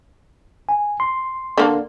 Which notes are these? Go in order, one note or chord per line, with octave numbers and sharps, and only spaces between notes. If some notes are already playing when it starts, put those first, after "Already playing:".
G#5
C6
D3 A#3 A4